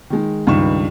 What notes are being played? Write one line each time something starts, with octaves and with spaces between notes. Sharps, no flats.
D#3 G#3
C#2 G2 D#3 C#6 E7